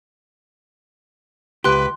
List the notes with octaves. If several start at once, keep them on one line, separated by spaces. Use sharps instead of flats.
C#2 G4 B4 C6 F#6